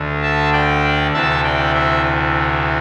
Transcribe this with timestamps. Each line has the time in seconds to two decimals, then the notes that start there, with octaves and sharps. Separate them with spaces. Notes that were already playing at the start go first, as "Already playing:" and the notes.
Already playing: D2 D3
0.22 E5 A5
0.52 D5 G5
1.13 D2 C3 E3 E5 A5
1.44 D5 G5
1.74 C5 E5